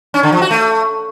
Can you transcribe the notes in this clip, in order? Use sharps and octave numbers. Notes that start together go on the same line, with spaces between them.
C#4
D3
F3
F#4
A3